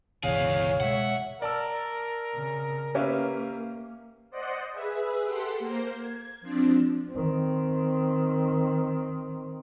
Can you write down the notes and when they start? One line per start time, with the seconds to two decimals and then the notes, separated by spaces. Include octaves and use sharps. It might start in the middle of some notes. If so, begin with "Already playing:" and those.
0.23 G1 C#2 B2 E3 G#4 C#5 F5
0.80 B2 G#3 E5 F#5
1.42 A#4 D5 A5 E6
2.35 C#3
2.95 A#3 C#4 G4 B4 E5 F5
4.30 C5 D5 D#5 F#5
4.72 G#4 B4 E5
5.24 G4 A4 F#5 G5 C6
5.59 A#3 A#4 C5
5.98 G#6
6.41 F3 C4 D4
7.11 D#3 C4